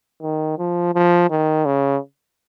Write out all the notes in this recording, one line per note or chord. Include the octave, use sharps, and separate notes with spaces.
D#3
F3
F3
D#3
C#3